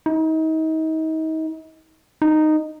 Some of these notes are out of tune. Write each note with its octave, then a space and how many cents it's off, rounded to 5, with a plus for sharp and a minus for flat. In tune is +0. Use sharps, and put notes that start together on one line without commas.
D#4 +35
D#4 -10